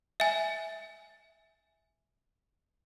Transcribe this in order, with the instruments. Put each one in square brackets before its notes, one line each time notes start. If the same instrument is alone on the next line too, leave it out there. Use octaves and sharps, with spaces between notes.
[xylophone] E5 G#5